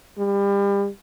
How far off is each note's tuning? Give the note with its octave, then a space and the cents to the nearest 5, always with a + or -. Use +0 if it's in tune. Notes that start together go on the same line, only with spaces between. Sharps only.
G3 +30